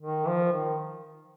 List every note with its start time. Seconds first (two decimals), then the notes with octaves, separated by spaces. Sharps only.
0.02 D#3
0.27 F3
0.52 D#3